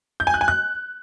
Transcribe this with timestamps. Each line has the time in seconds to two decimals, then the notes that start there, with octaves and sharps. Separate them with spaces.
0.20 G6
0.27 G#5
0.34 F#6
0.41 G#5
0.48 F#6